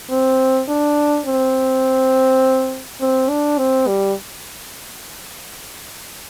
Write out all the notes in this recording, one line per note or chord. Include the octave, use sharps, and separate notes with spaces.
C4
D4
C4
C4
D4
C4
G3